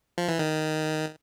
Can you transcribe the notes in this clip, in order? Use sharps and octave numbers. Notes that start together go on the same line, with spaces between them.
F3
E3
D#3